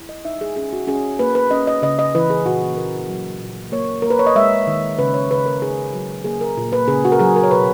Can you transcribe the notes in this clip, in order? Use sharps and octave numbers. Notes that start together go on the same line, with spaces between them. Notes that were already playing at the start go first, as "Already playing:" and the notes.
Already playing: E4
D#5
D#4 E5
G#4
C#4 G#4
F#4
C#4 G#4
A#3 B4
B4
C#4 D#5
D#5
C#3 D#5
D#5
E3 B4
G#4
A#2 F#4
A#2 A#4
F#3
A#2
A#3 C#5
A#3 A#4
B4
C#5
D#5
G#3 E5
D#3
C#3 B4
C#5
C#3 B4
A#4
D#4 G#4
F#3
A#3 G#4
A#4
A#2
B4
C#3 G#4
F#4
A#4
F#3 G#4
A#4
C#5
B2 B4